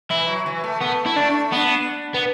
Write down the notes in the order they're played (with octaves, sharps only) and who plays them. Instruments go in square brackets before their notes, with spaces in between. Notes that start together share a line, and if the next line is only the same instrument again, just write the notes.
[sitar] E3 [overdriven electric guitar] E4
[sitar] F#3
E3
A3
[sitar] A3 [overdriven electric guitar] B3
[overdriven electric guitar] E4
[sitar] A3 [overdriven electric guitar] D4
[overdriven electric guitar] B3 [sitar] D4
[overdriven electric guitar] B3